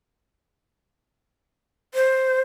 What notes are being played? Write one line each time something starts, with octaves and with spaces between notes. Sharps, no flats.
C5